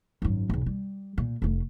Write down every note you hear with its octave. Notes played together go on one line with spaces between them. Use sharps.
G#1 F#2
B1 E2
G3
A#2
F1 A3